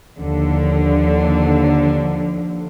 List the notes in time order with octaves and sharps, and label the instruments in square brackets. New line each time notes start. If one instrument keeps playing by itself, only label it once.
[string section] D#2 D3 F3